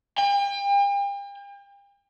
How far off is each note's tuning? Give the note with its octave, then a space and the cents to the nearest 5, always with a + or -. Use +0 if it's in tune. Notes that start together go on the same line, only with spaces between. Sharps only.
G5 +40